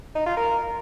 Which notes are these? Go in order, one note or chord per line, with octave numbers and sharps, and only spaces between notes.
D#4
F4
A#4